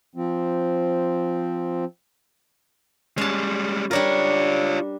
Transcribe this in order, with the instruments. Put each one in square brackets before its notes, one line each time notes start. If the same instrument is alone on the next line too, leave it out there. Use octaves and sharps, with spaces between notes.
[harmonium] F3 C4
[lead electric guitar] G3 G#3 [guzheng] C#4 A5
[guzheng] G3 D4 A#4 [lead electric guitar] F4 C#5